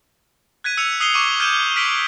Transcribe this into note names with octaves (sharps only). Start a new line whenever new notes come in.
F#6 G#6 B6 D#7
E6 C#7 D#7 F7 F#7
D#6 E6 C7 D#7 F7 G7
C#6 D6 E6 D#7 F#7
F6 G6 G#6 D#7 E7 F#7
F6 B6 D7 F#7